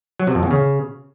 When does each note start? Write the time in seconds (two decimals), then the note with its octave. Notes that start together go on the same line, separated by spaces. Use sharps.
0.20 F#3
0.27 C3
0.35 F2
0.43 E2
0.51 C#3